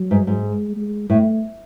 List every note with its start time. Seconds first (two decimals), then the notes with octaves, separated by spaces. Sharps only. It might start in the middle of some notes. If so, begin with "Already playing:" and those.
Already playing: F#3
0.11 G#2
0.27 G#2
0.44 G#3
0.76 G#3
1.10 A2 A3